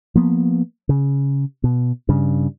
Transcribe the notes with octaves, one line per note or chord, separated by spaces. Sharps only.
F3 A#3 B3
C#3
B2
G2 C#3